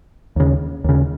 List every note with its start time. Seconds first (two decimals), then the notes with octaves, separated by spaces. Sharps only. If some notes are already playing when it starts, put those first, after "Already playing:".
0.36 D#2 C#3
0.84 D#2 C#3